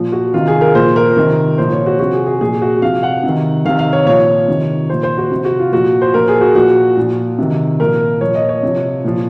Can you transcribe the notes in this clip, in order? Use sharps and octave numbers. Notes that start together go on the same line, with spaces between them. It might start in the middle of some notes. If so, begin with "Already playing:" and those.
Already playing: A#2 F3
F#4
C3 D#3 F4
G#4
A#4
A#2 F3 C5
A#4
C3 D#3
A#2 F3 C5
C#5
F#4
C3 F3 F#4
G#4
G#4
A#2 F3 G#4
F#4
C3 F3 F5
F#5
C3
D#3
C3 D#3 F5
F5
C#5
A#2 F3 C#5
C3 D#3
A#2 F3 C5
C5
F#4
C3 F3
F#4
F4
A#2 F3 F#4
C5
A#2 F3 A#4
G#4
F#4
A#2 F3 F#4
A#2 F3
C3 D#3
A#2 F3 A#4
A#2 F3 C#5
D#5
C#5
C3 F3
A#2 F3